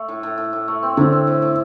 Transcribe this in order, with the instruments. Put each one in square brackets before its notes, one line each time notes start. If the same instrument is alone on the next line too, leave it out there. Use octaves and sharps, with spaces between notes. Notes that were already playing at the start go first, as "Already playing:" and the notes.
Already playing: [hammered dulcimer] A3
A2
A2
A2
A2
A3
C4
[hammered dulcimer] A2 [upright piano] D3
[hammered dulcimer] C4
A2
A2